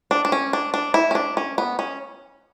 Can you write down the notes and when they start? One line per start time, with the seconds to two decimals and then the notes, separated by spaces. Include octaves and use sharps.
0.11 D4
0.25 D4
0.32 C#4
0.53 D4
0.74 D4
0.94 E4
1.11 C#4
1.15 D4
1.37 C#4
1.58 B3
1.79 C#4